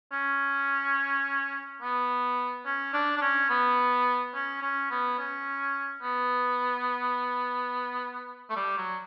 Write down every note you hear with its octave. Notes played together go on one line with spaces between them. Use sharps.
C#4
B3
C#4
D4
D4
C#4
B3
C#4
C#4
B3
C#4
B3
A3
G3
F#3